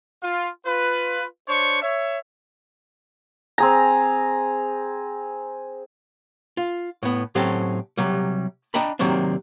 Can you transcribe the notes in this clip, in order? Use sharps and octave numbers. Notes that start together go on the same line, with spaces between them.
F4
F4 B4
D4 C5 C#5 C#6
C#5 E5
C4 G#4 A#5
F4
A2 B3
A2 F#3 C4 C#4 G4 A4
C3 F#3 G3
D4 D#5 G5 A#5 B5
C3 D#3 F#3 A#3 C4 D4